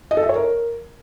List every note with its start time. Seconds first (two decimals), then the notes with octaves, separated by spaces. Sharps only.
0.11 D#5
0.17 A4
0.23 E5
0.29 C#5
0.35 A#4